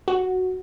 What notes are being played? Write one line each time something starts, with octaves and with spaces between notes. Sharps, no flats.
F#4